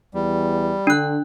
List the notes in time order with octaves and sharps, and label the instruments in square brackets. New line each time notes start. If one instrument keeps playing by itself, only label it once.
[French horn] E2 [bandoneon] G3
[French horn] D3 [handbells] D4 F#6